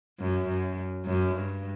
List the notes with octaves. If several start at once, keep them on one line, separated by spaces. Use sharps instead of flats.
F#2
F#2
F#2
G2